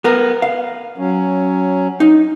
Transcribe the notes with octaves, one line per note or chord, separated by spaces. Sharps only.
B3 A#4
F5
F#3 C#4
D#4